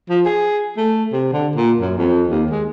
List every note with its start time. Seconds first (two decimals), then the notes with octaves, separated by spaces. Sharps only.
0.10 F3
0.25 G#4
0.77 A3
1.12 C3
1.33 D3
1.56 A#2
1.80 F#2
1.98 F2
2.28 D#2
2.51 G#3